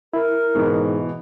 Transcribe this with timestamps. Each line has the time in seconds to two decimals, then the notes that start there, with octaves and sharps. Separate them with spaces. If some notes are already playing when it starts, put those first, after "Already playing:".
0.14 E4 A#4
0.55 G#2 B2 E3